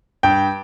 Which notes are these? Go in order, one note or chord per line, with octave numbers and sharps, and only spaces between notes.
G2 G5